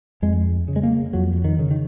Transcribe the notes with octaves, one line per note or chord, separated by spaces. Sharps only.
F2 G#3
C#3
G#3
A#3
F2 F#3
D#3
C#3
D#3